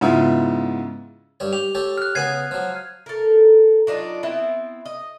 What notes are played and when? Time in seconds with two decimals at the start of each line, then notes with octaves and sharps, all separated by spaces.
0.01 G#2 C#3 B3 E4 F4
1.40 G2 G3 C#5
1.53 G4 F7
1.75 G4 A4 C#5
1.98 F6 F#6
2.15 C#3 B3 G#4 G#6 C7 D#7
2.51 F3 F#3
3.06 A4 A#4
3.87 F#3 D4 D#4 F4
4.23 B3 C4 E4
4.85 D#5